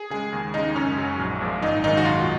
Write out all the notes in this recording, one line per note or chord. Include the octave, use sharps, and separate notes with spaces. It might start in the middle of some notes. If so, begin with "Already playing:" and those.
Already playing: G#4
C#3 G#3 G#4
D#2
C#3 G#3 D#4
F#2 C#4
C#3 F#3
A#1
A#2 F3 G#3
G#1 D#4
F#2 D#3 G#3 D#4
F#4
B1 F4